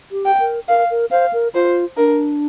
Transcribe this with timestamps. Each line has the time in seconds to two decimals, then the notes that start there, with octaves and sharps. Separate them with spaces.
0.12 G4
0.25 G5
0.40 A#4
0.68 A#4 F5
0.90 A#4
1.11 C5 F5
1.33 A#4
1.55 F4 C5
1.97 D4 A#4